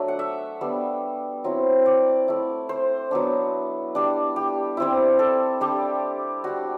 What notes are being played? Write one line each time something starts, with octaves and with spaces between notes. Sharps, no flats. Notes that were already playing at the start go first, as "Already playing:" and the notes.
Already playing: F#3 A3 D4
F#5
E5
G3 B3 D4
F#3 C4 E4
D5
A3 E4
C5
F#3 B3 D4
G3 D4
G4
G3 C4 E4
A4
G3 D4 G4
G3 D4 F#4